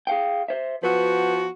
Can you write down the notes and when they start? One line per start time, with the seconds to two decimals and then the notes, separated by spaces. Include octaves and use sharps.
0.07 G#4 F5 G5
0.48 C5 E5
0.83 F3 B3 F#4 B4